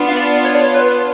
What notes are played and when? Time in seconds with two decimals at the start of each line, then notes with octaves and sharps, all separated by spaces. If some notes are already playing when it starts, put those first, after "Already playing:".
Already playing: B3 D4 F4
0.09 F5
0.16 D5
0.45 C#5
0.55 D5
0.64 C#5
0.74 B4